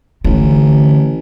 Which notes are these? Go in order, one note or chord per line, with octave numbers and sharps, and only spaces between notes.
A1 D3